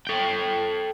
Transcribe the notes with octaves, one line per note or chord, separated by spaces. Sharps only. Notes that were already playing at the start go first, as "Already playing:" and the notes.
A4 G5